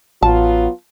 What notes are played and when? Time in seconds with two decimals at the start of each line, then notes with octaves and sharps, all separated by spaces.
0.23 A1 F#3 B3 F4 A5